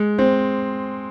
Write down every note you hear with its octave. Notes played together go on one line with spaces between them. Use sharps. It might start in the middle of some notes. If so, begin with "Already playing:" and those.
Already playing: G#3
C4